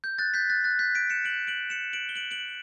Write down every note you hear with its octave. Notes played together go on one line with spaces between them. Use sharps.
G6
F#6 A6
G6 B6
F#6 A6
F#6 A6
G6 B6
B6 D7
C#7 E7
D7 F#7
D7 F#7
C#7 E7
D7 F#7
G7
D7 F#7
D7 F#7